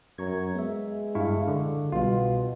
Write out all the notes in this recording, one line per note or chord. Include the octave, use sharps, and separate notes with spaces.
F#2 A#5 C#6 G#6
G#3 B3 E5
G2 E4 F5 C#6
D3
C2 B2 G3 F4